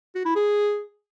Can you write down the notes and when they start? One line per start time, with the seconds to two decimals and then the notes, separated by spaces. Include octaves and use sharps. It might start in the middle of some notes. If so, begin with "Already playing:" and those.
0.15 F#4
0.25 E4
0.36 G#4